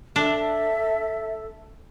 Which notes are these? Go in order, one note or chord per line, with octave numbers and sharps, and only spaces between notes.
D4 A4 E5